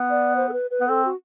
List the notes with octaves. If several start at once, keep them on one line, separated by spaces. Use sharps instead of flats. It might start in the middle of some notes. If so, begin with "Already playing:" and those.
Already playing: B3
D5
C5
A4
B4
B4
B3
C4 A4
F#4